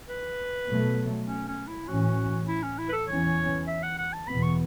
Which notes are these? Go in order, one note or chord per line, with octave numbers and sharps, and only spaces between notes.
B4
B2 F#3 A3
C#4
C#4
E4
A2 E3 C#4 F#4
E4
C#4
E4
B4
A4
E2 E3 C#4 C#5
E5
F#5
F#5
A5
E2 B2 B3 B5
C#6